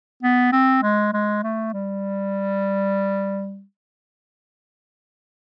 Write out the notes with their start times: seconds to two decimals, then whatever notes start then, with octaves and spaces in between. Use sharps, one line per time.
0.23 B3
0.53 C4
0.83 G#3
1.13 G#3
1.44 A3
1.73 G3